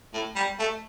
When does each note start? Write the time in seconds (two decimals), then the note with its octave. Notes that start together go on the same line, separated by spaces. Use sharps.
0.14 A2
0.36 G3
0.59 A3